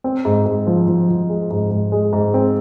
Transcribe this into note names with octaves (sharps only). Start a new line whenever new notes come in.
C4
G#2
G#2
F3
F3
F3
G#3
G#2
G#2
G#3
G#2
C4